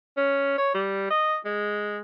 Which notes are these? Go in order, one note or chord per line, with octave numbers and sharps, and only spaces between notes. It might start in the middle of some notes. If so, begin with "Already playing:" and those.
C#4
C#5
G3
D#5
G#3